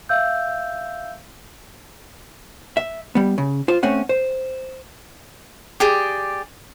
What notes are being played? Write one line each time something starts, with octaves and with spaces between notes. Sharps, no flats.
E5 F5 E6 G6
E5
G3 B3
C#3
F4 C5
A3 C4 C#4 F#5
C5
G4 G#4 D5